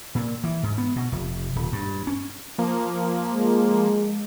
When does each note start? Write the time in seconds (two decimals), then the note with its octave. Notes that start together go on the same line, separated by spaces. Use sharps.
0.15 A#2
0.44 E3
0.63 G#2
0.78 B3
0.96 B2
1.12 F1
1.56 D#1
1.73 G2
2.07 C#4
2.58 F3 A#3
3.33 G#3